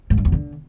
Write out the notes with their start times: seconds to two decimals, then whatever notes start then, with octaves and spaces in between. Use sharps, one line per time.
0.10 G#2
0.18 G2
0.25 E2
0.32 D3